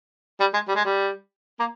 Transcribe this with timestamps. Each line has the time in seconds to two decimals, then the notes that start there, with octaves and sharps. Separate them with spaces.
0.40 G3
0.54 G#3
0.68 G3
0.75 G#3
0.85 G3
1.60 A#3